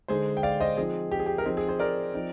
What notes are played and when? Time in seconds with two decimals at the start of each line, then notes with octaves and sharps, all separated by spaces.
0.08 D3 G#3 D#4 G#4 C5
0.37 G5
0.43 D5 F5
0.60 C5 D#5
0.77 F3 C4 D#4 G#4
1.11 G4
1.19 G#4
1.26 G4
1.38 A#4
1.45 F3 C4 D#4 G#4
1.57 G#4
1.68 G#4 C5
1.79 A#4 D5
2.14 F3 C4 D#4